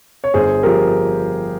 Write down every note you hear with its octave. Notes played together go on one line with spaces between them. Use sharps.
C#5
G1 G#4 C5
G2 F3 G4 A#4